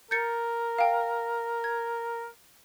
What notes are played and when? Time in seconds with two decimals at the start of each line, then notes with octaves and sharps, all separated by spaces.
0.11 A#4 G6 A6 C#7
0.78 F5 G5
1.64 G#6